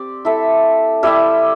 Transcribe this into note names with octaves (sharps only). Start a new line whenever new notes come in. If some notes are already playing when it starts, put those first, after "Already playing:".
Already playing: C4 G4 D5
E4 A4 E5
G3 E4 G4 E5